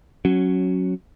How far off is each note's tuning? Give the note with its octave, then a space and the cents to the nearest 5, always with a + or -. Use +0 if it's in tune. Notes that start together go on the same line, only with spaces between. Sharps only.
F#3 +0 C#4 -10